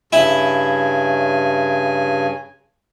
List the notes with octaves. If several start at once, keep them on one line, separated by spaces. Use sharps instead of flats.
G2 C#3 E4 G#5